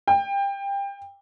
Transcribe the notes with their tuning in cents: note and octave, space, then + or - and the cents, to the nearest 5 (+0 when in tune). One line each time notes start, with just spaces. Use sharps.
G5 +25